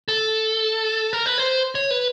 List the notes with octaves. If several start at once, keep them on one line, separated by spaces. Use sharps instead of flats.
A4
A#4
B4
C5
C#5
B4